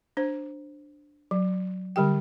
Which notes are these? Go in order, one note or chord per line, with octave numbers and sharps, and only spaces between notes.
D4 C5
F#3
D3 G3 G4 G5